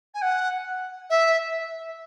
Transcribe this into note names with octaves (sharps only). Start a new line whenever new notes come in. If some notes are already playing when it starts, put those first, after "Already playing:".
G#5
F#5
E5